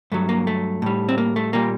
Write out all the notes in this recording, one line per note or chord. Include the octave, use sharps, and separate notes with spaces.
G2 F#3 A3
A#3
A3
A2 G3
C4
A#3
A3
A#2 G3 A#3